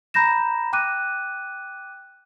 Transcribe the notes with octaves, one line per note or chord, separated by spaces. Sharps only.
A#5 B5 G6 A#6 E7
G5 D6 F#6 D#7